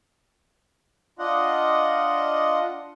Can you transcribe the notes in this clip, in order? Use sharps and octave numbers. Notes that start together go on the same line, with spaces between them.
D4 F4 D#5 F#5